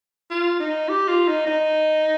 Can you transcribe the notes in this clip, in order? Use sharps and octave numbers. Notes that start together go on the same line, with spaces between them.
F4
D#4
G4
F4
D#4
D#4